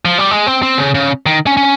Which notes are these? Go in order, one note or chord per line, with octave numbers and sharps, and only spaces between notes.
F3
G3
G#3
C4
C4
C#3
C#3
D#3
C#4
C#4